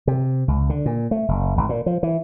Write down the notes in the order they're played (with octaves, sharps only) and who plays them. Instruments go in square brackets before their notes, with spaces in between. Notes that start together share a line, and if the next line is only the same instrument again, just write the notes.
[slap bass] C3
C#2
D3
A#2
A3
F#1
G#1
A#2
F3
E3